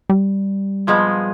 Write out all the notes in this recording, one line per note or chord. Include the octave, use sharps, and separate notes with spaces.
G3
A#2 F3 G#3 B3